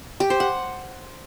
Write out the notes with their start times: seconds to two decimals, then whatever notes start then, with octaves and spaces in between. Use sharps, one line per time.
0.20 G4
0.30 C5
0.40 F#5